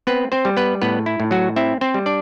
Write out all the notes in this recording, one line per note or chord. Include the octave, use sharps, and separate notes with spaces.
B3 C4 B4
C4 C5
G3
B3 B4
A2 B3 B4
E4
A2
F#3 F#4
C4 E4 E5
C4 C5
G3
D4 D5